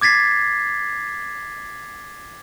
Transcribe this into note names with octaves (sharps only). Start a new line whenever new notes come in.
D6 G#6 A6 B6 C7